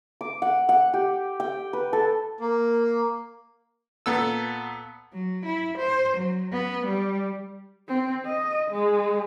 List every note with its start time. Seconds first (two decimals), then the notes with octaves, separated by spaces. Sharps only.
0.21 D6
0.42 F#5
0.69 F#5
0.94 G4
1.40 G5
1.73 B4
1.93 A4
2.40 A#3
4.06 A#2 B3 A4 E6
5.13 F#3
5.45 E4
5.78 C5
6.17 F#3
6.52 B3
6.86 G3
7.88 C4
8.26 D#5
8.71 G#3